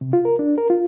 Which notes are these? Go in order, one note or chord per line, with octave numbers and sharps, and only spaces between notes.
C3
F4
A#4
D4
A#4
F4